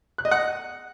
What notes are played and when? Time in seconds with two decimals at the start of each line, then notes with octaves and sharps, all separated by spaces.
0.18 F#6
0.25 D#5
0.31 F#5